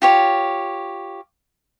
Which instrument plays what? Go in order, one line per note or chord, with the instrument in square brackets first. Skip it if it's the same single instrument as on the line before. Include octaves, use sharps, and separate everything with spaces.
[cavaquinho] F4 G4 C#5